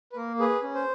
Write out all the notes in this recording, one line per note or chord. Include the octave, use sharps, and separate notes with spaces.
B4
A#3 A#4
G#4 B4
C#4
C5